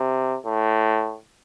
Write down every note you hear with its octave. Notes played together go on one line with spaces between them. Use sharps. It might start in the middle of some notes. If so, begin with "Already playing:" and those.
Already playing: C3
A2